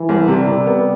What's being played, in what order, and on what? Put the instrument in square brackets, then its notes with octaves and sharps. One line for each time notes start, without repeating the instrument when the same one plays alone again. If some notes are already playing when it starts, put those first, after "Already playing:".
Already playing: [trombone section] E3
[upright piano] C2
[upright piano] C3 [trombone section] G3
[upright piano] C3
B3